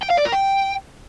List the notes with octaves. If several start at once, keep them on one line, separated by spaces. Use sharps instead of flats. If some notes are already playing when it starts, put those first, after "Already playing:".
G5
F5
D5
A#4
G5